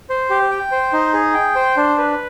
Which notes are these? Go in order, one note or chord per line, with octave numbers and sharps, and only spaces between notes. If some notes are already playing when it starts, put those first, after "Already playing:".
C5
G4
G5
C5
D#4
G#4
G5
C5
D4
B4